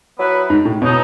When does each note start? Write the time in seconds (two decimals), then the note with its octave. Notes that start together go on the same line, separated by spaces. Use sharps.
0.18 F#3 B3 E4 B4
0.50 G#2
0.65 A2
0.82 B2 F#3 B3 D#4 A4